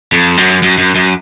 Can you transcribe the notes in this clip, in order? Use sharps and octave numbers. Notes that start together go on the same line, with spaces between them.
F2
F#2
F#2
F#2
F#2